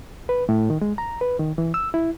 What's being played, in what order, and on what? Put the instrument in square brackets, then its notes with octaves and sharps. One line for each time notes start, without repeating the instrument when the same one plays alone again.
[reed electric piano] B4
A2
D#3
G#3
A#5
B4
D#3
E3
E6
E4